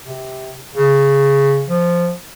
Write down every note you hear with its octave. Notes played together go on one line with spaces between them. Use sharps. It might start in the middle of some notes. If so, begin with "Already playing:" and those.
C3
C#3
F3